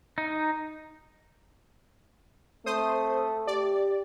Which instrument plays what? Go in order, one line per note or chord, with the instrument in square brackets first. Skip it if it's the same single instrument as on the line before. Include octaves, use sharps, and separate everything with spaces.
[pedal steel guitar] D#4
[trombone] A3 [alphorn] C4 [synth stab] C5 D#6
[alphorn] G4 [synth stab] D5